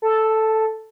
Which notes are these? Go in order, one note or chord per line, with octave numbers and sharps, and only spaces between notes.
A4